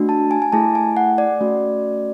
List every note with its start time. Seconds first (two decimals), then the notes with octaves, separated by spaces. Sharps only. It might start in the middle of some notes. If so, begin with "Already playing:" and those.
Already playing: A3 D4 F#4
0.09 A5
0.31 G#5
0.42 G#5
0.52 A3 E4 G#4 A5
0.75 G#5
0.97 F#5
1.18 D5
1.41 A3 C#4 F#4